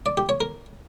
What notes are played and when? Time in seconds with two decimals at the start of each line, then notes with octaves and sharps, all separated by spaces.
0.06 D5
0.17 G4
0.29 C#5
0.41 A#4